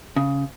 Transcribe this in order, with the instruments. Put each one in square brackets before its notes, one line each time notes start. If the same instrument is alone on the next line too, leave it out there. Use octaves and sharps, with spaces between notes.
[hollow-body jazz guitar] C#3